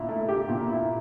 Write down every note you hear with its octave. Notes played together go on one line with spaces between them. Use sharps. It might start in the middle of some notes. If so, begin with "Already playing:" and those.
Already playing: A#2 E4
A3
G4
A#2
E4